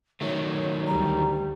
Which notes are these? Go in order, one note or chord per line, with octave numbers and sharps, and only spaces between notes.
D#3 F#3 A3 C#5
D2 G3 A#5